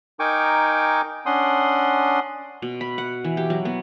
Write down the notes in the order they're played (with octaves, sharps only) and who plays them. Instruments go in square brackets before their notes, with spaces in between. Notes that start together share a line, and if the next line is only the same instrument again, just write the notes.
[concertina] D#4 A#4 G5 G#5 C#6 D6
C#4 D4 F#5 C6 D#6
[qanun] B2
B5
F#5
E3
G4
F#3
B3